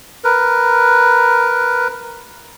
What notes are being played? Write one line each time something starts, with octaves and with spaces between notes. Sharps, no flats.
A#4 B4